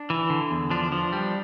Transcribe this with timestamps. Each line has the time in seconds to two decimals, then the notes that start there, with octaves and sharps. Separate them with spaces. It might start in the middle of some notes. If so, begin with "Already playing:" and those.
Already playing: D4
0.10 E3
0.30 D3
0.51 E2
0.71 F3 D4
0.92 F3
1.13 G3